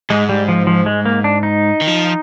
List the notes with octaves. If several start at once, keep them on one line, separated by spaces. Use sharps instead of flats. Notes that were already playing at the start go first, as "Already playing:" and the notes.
G#2 G#3
G3
F3
F3
G#3
A#3
D4
D#4
D#3
F3